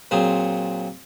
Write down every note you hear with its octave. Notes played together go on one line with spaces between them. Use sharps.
A#2 F#3 C4 G#4